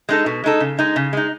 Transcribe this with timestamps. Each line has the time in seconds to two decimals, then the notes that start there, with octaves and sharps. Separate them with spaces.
0.09 G#3 D#4 A4
0.26 B2
0.44 G#3 D#4 A4
0.60 C#3
0.79 G#3 D#4
0.96 C#3
1.13 G#3 D#4